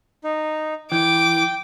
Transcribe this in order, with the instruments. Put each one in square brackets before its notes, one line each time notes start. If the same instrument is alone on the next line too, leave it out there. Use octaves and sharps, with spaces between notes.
[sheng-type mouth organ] D#4
[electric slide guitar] E3 [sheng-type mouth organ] G5 [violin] D6